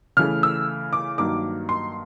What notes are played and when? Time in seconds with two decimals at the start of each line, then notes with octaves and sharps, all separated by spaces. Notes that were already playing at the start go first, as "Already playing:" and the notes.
0.17 C#3 E3 A3 F6
0.43 E6
0.93 D6
1.18 G2 D#3 F#3 A#3 D6
1.69 C6